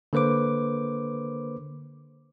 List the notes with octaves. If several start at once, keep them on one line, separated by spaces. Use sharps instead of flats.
D3 A#3 B4 C5 D6